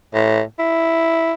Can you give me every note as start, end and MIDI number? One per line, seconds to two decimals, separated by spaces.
0.14 0.41 45
0.59 1.33 64